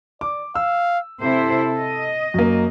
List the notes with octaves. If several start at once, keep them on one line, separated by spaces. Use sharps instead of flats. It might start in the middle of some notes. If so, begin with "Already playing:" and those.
D5 D6
F5 E6
C3 E4 A4 C5
D#5
F#2 A#3